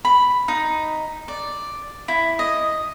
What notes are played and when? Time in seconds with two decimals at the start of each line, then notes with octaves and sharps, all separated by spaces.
0.05 B5
0.48 D#4
1.28 D5
2.08 E4
2.39 D#5